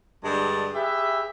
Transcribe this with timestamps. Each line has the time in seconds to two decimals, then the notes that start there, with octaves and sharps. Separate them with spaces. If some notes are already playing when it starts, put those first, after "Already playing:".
0.24 G2 D3 G#3 A5
0.74 G4 G#4 B4 E5